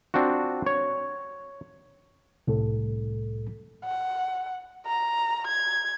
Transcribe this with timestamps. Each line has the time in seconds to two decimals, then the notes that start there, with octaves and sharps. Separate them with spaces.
0.14 C4 D4 F4 F#4
0.66 C#5
2.47 C2 A2 A4
3.84 F#5
4.87 A#5
5.47 G#6